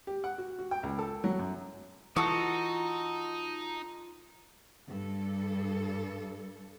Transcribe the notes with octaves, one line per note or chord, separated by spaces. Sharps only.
G4
F#5
F#4
F#4
G5
C#2
A4
F#3
F#2
E3 D#4 F4 F#4 A4 C#6 D#6
G2 A4